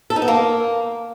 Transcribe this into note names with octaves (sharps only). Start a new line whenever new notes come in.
A4
D#4
B3
A#3